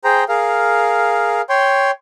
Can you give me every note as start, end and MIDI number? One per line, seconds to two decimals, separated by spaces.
0.04 0.24 68
0.04 0.24 72
0.04 0.24 79
0.04 0.24 82
0.29 1.41 68
0.29 1.41 70
0.29 1.41 77
1.49 1.91 73
1.49 1.91 79
1.49 1.91 84